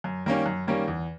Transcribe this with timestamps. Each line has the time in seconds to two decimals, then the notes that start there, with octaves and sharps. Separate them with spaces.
0.04 F#2
0.26 D#3 G3 A#3 C#4
0.46 F#2
0.67 D#3 G3 A#3 C#4
0.88 E2